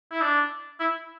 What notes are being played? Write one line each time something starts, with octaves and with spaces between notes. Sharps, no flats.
E4
D4
E4